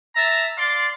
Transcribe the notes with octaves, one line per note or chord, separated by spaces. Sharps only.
E5 A5 A#5
D5 F5 C6